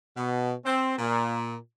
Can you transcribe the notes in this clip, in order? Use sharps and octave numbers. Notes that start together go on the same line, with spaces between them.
B2
C4
A#2